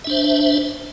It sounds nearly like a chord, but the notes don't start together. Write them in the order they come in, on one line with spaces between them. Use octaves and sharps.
E5 D4 C5